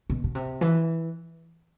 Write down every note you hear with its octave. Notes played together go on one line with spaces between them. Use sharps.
B2
B2
C3
E3